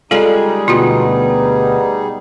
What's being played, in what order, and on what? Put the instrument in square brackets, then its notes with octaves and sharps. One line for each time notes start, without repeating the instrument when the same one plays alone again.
[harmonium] G3 D#4 G#4 [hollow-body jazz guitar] G#3 F4 [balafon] A4 D5
[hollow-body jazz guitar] D2 B2 [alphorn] B3 [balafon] F4 F#4